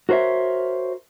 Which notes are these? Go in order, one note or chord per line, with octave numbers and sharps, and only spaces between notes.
F#4 A#4 C5 C#5 E5